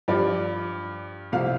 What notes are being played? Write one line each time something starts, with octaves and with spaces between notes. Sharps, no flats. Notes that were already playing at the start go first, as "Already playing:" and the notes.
G2 F3 D5
C2 C3 F3 F5